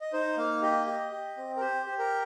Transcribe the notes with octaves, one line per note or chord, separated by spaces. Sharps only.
D#5
D#4 C5
A#3 F5
G4 D#5
G4
G4
C4
A#4
G4 C5
G4
A#4